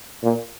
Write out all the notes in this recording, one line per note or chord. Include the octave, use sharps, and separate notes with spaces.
A#2